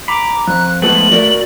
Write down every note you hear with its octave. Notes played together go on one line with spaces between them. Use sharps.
A#5 B5 D6
F2 F#6
F3 G#3 A3 B3 A4 F#7
F#4 A#4 D5